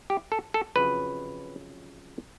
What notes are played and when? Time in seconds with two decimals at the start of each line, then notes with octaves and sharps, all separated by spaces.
0.10 G4
0.32 A4
0.54 A4
0.76 F2 C#3 F#3 B4